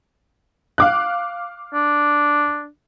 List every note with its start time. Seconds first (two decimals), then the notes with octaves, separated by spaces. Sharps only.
0.78 F5 D6 F#6
1.74 D4